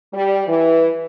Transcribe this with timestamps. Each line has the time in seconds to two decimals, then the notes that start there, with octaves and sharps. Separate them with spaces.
0.14 G3
0.47 E3